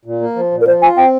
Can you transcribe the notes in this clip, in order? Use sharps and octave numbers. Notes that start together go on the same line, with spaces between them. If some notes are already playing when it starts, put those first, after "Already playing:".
A#2
A#3
F3
A#2
A#4
F3 C5
F4 G#5
C4 G5